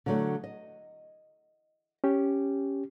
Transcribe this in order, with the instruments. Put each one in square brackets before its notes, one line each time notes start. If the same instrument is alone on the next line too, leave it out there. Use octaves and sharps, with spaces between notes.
[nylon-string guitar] D3 F#3 A3
D#5
[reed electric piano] C#4 G4